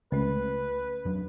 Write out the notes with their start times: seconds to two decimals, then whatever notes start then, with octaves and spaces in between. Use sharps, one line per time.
0.12 C#2 A3 C#4 B4
1.05 F2 F#3 D4